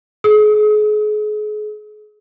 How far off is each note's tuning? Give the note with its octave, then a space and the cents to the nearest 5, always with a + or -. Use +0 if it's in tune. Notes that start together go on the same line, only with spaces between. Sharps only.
G#4 +35 D#6 +45